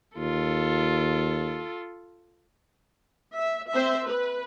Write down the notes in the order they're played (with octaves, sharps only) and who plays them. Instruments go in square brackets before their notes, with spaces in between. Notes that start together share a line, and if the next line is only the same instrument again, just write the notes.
[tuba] D#2 [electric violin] F4 A4
[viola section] E5
C4 C5 E5
B4